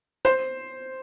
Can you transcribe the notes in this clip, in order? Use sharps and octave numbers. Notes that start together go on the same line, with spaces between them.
C5